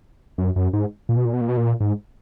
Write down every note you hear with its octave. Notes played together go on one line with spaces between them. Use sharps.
F#2
F#2
G#2
A#2
B2
A#2
B2
A#2
B2
A#2
G#2